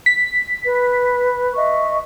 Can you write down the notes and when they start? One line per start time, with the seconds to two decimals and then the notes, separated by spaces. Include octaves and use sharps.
0.06 B6
0.64 B4
1.55 D#5 E5 C#6